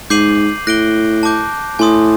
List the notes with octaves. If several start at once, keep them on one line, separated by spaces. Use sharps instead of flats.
G#2 D6 G6 C7 D#7 F#7
A2 F#6 A#6 D7 G7
A5 D6 G6
A2 G#5 C6 D#6